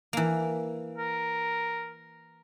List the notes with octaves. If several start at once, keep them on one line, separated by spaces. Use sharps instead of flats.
E3 A#3
A#4